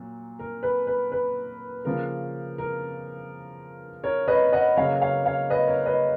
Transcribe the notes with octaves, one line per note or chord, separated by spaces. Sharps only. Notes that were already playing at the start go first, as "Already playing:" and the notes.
Already playing: A#2 F#3
A#4
B4
B4
B4
C#3 F3 A#3 A#4
A#4
A#4 C#5
B4 D#5
D#5 F#5
C#3 F#3 A#3 C#5 F5
C#5 F5
C#5 F5
B4 D#5
A#4 C#5
B4 D#5